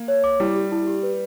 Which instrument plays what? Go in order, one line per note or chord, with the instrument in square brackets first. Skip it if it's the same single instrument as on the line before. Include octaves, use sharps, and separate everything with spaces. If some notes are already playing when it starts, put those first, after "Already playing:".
Already playing: [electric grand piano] A#3
[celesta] C#5
D6
[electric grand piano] G3 [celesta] E4
[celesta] G4
E4
G4
B4